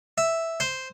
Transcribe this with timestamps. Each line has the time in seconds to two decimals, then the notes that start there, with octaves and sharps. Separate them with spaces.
0.18 E5
0.60 C5